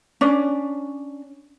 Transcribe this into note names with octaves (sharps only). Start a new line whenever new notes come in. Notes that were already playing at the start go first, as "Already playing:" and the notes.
C#4 D4 D5